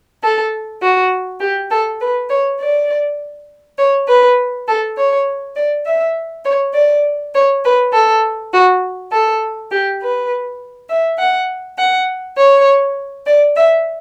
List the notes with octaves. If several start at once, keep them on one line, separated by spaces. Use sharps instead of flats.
A4
F#4
G4
A4
B4
C#5
D5
C#5
B4
A4
C#5
D5
E5
C#5
D5
C#5
B4
A4
F#4
A4
G4
B4
E5
F#5
F#5
C#5
D5
E5